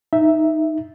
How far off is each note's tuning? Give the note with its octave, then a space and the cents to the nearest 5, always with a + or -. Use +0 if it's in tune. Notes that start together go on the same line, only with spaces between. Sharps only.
D#4 +0 E5 +0